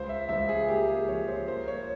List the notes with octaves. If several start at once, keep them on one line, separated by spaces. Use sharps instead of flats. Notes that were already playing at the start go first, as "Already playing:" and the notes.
Already playing: C#2 C5
E5
C#2 E5
G#4
A#3 G4
G#4
F3 C#5
C5
A#3 C5
C#5